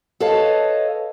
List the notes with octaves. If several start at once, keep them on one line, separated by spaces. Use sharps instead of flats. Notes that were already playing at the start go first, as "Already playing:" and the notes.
A4 B4 C#5 D#5 F5 A5